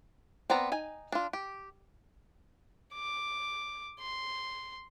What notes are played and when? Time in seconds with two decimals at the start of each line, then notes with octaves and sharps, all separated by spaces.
0.50 B3 C4 D5 G5 A#5
0.72 D#4 G#5
1.12 D4 F4
1.33 G4
2.94 D6
4.00 C6